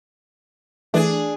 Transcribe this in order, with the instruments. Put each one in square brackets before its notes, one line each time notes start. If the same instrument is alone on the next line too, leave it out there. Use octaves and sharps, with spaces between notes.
[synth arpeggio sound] E3 A3 [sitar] D4 G#4